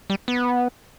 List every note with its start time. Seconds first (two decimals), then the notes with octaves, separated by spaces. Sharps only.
0.10 G3
0.28 B3